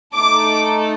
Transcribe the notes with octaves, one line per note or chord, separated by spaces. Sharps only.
A3 D#4 A4 D6